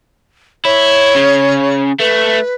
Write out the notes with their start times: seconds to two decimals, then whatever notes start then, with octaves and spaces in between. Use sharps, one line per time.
0.65 E4 C#5
1.15 C#3
1.99 A3 B4